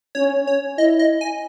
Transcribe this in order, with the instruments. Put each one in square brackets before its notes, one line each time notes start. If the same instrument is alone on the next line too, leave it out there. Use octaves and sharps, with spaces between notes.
[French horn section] C#4 [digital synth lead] C#5
[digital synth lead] C#5
[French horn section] E4 [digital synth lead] D#5
[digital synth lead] D#5
G#5